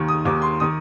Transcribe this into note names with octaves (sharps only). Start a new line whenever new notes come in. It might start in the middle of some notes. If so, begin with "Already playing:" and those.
Already playing: D#2 D#3
D#6
D#2 D#3 D6
C6
D#3 D#6